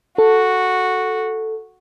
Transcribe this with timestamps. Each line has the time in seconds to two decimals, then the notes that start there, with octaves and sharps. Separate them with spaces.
0.18 F#4 A4